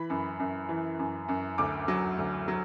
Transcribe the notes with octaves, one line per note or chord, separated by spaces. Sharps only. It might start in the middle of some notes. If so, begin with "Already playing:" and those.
Already playing: E3 B5
F#2
F#2
E3
F#2
F#2
D2 D6
F#3
D2
F#3